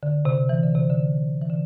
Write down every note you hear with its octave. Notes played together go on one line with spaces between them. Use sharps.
D3
C3
E3
D3
C3
D3
E3
D3